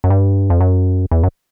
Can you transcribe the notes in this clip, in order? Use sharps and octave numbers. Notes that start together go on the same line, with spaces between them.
F#2
G2
F2
F#2
E2
F#2